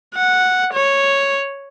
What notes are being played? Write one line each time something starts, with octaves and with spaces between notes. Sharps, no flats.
F#5
C#5